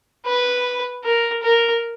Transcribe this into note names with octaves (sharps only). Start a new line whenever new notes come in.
B4
A#4
A#4